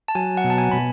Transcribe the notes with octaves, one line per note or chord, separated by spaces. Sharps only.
A5
F#3 G#5
F#5
B2
A5
G#5
B2 B5